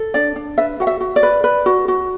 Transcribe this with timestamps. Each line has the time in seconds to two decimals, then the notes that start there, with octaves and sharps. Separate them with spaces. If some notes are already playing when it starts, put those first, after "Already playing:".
Already playing: A4
0.14 D4 D5
0.36 D4
0.58 B4 E5
0.80 F#4 F#5
0.87 E5
1.00 F#4
1.16 D5
1.23 B4
1.44 B4
1.66 F#4
1.88 F#4